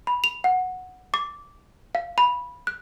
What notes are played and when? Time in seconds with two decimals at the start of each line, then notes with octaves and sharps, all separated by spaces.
0.07 B5
0.24 F7
0.44 F#5
1.14 D6
1.95 F5
2.18 B5
2.67 F#6